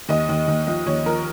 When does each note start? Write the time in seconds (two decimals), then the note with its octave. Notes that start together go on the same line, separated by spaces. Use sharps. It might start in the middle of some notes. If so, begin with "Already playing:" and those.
0.09 D#2 D#5
0.29 D#2
0.48 D#2
0.67 F3 D#5
0.86 D#2 C#5
1.06 F3 A#4